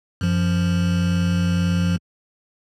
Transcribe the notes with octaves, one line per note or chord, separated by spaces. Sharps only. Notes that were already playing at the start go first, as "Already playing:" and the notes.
F#2 F3